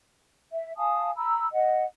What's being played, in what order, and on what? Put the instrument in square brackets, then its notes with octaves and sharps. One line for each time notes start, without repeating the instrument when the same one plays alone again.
[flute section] E5
F5 G#5 A5 D#6
A#5 B5 E6
D#5 F#5